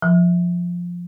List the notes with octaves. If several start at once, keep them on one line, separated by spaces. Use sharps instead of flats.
F3